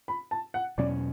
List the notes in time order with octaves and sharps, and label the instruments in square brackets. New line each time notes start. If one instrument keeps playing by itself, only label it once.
[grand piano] B5
A5
F#5
[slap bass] E2 B2 F#3 C#4 [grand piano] D5